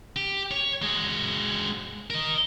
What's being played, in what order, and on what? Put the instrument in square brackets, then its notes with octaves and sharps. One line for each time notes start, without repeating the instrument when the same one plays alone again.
[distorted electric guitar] G4
C#5
G#3 F#4
A#4 D#5